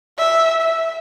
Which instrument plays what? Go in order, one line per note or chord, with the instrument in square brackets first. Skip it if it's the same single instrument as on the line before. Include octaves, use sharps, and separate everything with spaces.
[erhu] E5
E5